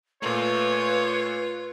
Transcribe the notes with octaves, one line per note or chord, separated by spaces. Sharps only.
A#2 A3 F4 B4 C#5